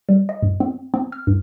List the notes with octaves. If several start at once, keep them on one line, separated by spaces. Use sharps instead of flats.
G3
D#5
G2
C4
C4
F6
G2